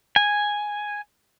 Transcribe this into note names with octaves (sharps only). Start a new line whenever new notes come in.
G#5